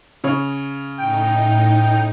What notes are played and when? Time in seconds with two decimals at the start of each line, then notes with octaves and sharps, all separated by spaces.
0.24 C#3 C#5
0.98 A2 D#4 G5